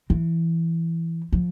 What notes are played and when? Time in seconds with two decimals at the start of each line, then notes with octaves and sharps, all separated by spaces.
0.10 E3
1.32 F3